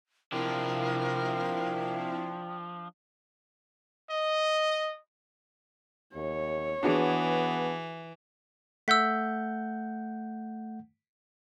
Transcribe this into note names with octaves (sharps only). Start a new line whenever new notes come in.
C3 F3 D4 E4 A#4 F5 G5
D#5
D#2 C#5
E3 B3 D4 F#4 G#4
A3 F#5 E6 G6 B6